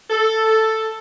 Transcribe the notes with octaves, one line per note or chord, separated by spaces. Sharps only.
A4